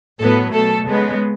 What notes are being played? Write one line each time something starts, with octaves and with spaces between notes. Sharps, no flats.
A2 F#3 B3 A4
B2 A3 A4
C#3 G#3 B3